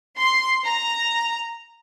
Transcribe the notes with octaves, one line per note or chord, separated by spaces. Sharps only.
C6
A#5